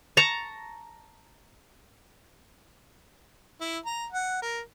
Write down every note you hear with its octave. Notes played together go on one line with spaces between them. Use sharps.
A5 A#5 C#6
E4
A#5
F#5
A#4